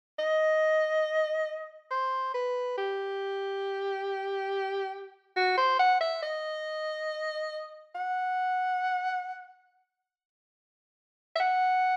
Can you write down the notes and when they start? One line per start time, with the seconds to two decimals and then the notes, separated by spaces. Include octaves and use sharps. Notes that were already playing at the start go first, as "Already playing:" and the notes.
0.19 D#5
1.91 C5
2.34 B4
2.78 G4
5.36 F#4
5.58 C5
5.79 F#5
6.01 E5
6.22 D#5
7.95 F#5
11.35 E5
11.40 F#5